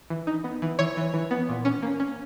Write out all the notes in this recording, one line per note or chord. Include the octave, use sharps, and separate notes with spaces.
E3
D#4
B3
E3
E3 C#5
E3
E3
B3
A#2
C#4
A#3
C#4